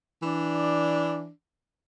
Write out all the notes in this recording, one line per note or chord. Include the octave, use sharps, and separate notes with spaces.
E3 D4